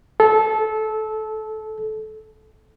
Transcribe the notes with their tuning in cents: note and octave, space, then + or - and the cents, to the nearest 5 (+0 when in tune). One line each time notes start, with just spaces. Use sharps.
A4 -20